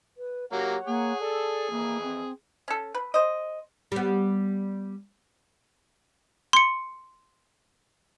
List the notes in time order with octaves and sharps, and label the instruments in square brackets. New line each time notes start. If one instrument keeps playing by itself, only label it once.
[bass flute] B4
[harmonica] F#3 A#3 [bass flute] G4 [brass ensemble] C#5 F#5
[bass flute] A#3 [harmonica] G#4
[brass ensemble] A4 [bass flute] D5
[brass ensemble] F2 E3 [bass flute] A#3
[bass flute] C4
[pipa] C#4 A4
B4
C5 D#5
[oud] G3 B3
[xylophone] C6 C#7